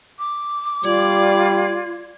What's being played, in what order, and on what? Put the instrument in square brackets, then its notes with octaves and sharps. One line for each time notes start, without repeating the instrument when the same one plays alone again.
[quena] D6
[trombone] G3 [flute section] F4 G#6 [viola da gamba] D5